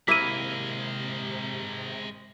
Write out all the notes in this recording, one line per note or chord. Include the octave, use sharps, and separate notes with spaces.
C3 G#3 A#3 E4 A#4 B6 D#7